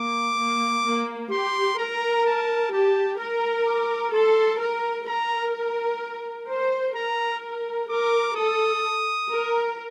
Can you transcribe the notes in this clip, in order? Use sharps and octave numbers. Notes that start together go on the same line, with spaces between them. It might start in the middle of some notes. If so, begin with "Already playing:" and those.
Already playing: A#3 D6
A#3
A#3
G4 C6
A#4 A#5
A5
G4 A5
A#4 A#5
D6
A4 C6
A#4
A#4 A#5
C5
A#4 A#5
A#4 D6
A4 D#6
A#4